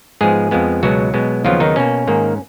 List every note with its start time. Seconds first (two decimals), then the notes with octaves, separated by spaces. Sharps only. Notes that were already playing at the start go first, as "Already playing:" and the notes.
0.21 G#2 F3 G#3 B3 G#4
0.51 F2 F3 G#3 B3
0.83 C#2 B2 F#3 G#3 B3 F#4
1.14 B2 G#3 B3
1.44 D#2 C#3 F3 F#3 B3 F4
1.60 D#3 D#4
1.76 B2 A#3 C#4
2.07 G#2 D#3 A#3